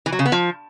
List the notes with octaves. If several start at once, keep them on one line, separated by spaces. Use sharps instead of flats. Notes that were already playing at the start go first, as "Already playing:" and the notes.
E3
F#3
C#3
B3
F3